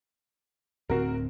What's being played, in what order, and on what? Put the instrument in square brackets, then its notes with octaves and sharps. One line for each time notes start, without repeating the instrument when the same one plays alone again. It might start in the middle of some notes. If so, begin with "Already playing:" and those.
[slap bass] D1 D2 C4 [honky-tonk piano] F#4 A#4